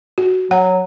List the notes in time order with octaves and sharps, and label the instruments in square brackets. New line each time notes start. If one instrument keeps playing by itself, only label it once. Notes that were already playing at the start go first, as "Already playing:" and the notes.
[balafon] F#4
[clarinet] F#3 [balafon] F#5